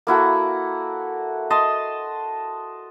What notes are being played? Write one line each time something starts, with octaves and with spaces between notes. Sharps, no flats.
A#3 E4 F#4 A4
D#5 A5 C6